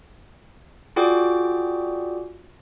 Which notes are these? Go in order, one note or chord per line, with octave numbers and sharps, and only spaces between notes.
F4 F#4 G#4 D5 G5 D6